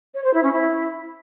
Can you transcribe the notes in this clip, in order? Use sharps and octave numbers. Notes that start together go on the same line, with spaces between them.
C#5
C5
E4
C#4
E4